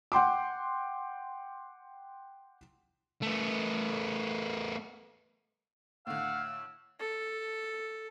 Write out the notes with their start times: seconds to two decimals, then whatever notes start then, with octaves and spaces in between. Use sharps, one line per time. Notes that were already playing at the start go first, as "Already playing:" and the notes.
0.12 F#5 G5 C6 D6
3.22 A3 B3
6.07 A2 D3 F5 F#5 E6
6.99 A4